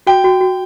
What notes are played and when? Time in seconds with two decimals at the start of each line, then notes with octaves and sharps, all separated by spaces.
0.07 F#4 G5
0.24 F#4
0.41 F#4